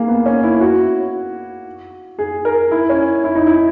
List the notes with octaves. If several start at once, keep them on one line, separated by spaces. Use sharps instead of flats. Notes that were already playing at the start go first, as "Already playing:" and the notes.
Already playing: A#3 G#4
B3
C#4
E4
F#4
G#4
A#4
E4
C#4
E4
D#4
E4